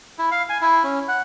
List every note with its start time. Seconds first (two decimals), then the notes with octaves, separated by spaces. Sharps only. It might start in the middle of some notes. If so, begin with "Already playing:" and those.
0.19 E4
0.31 F5
0.49 G#5
0.61 E4
0.83 C#4
1.08 F#5